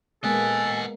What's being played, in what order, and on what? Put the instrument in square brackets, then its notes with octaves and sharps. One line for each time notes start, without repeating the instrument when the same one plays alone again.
[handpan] G#3 A#3 B3 [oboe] A4 [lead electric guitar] D#5 F#5 [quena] G#5